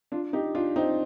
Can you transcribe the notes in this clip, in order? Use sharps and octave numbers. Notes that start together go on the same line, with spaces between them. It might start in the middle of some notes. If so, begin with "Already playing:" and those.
D4 F4
D#4 G4
D4 F4
C4 D#4